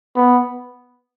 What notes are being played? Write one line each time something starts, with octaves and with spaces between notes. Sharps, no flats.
B3